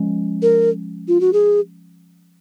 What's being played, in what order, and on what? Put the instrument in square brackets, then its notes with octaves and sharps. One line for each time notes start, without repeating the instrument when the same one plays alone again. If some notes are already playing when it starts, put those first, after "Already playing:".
Already playing: [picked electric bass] F3 G#3 C#4
[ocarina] A#4
F4
F#4
G#4